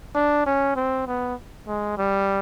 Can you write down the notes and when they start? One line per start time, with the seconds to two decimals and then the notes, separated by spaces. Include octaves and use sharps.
0.15 D4
0.46 C#4
0.76 C4
1.07 B3
1.68 G#3
1.98 G3